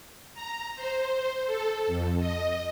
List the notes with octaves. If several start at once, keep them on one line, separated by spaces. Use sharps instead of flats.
A#5
C5
A4
F2
D#5